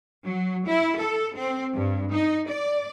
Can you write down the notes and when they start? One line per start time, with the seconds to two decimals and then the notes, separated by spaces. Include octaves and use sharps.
0.24 F#3
0.66 E4
0.99 A4
1.36 C4
1.73 G2
2.12 D#4
2.49 D5